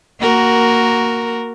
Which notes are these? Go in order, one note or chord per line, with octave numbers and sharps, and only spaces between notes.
A#3 F#4 A#4